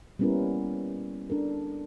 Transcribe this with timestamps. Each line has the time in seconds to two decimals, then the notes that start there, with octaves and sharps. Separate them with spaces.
0.19 G3 A#3 B3 C#4 E4 A#4
1.30 D4 A4 A#4